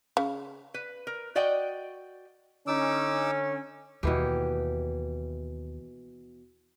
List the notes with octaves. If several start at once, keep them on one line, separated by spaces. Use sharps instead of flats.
C#3
B4
A#4
F#4 D5 D#5 F#5 G5
D3 C#4 D#4 D6 E6
D#2 B2 E3 G4